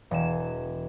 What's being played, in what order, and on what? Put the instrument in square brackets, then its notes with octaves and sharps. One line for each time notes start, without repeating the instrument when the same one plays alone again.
[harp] E1 G#4 E7